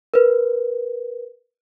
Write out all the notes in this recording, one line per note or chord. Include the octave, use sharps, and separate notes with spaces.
A#4 B4